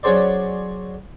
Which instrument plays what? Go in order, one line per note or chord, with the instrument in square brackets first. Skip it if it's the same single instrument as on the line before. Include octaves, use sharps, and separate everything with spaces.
[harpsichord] F#3 C#4 F#4 G#4 C5 D5